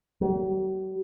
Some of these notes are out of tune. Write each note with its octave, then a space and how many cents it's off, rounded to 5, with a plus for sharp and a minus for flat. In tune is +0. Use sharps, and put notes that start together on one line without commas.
F#3 +45